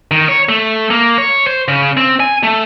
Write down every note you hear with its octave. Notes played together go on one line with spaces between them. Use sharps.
D#3
C#5
A3
A#3
C#5
C5
C#3
C4
G#5
A3